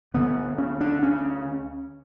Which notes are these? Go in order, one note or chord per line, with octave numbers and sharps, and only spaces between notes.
D2 D3 B3
C#4
D4
C#4